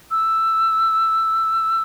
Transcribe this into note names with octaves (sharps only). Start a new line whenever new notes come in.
E6